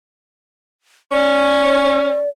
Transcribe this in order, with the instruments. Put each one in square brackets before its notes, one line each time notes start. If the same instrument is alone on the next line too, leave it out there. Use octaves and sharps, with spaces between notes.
[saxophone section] C#4 [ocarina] D5